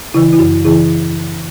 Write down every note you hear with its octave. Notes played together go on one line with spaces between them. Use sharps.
C#3 E3 E4
E4
F#2 F#4
C#3 E3 E4 G#4